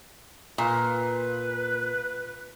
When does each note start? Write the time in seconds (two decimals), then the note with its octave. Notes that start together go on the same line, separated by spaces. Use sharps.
0.58 A#2 B4